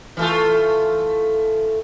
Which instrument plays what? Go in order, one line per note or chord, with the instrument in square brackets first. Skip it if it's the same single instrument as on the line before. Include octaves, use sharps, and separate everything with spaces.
[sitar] E3 A3 F4